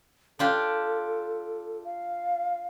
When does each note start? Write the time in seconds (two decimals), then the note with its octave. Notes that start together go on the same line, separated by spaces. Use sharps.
0.39 D4 F4 G4 A4
1.84 F5